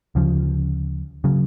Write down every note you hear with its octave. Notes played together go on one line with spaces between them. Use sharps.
D2 C#3 F3
C#3 F#3